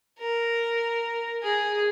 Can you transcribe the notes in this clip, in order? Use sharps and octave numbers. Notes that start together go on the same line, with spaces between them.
A#4
G#4